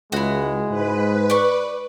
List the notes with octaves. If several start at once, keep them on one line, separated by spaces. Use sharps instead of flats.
C#2 G#3 E4 F#4
G#2 B4
D5 C#6